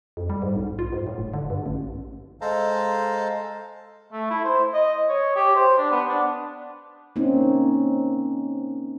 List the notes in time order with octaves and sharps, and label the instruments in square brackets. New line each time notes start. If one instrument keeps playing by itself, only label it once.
[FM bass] F2
G3
G#2
B1
F4
G#2
A2
F1
D3
G2
A1
[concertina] G#3 A4 C5 F5 A5 A#5
[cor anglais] A3
E4
C5
D#5
C#5
G4
C5
D4
B3
D4
[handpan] A#3 C4 C#4 D#4